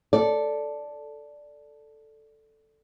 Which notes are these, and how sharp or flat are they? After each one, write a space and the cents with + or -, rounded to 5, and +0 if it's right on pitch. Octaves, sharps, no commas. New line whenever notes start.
A4 +0 D5 +0